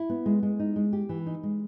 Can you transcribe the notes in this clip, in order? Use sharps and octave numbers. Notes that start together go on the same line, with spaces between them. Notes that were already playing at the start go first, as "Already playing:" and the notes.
Already playing: E4
B3
G#3
G#3
D#4
G#3
G4
E3
D#4
G#3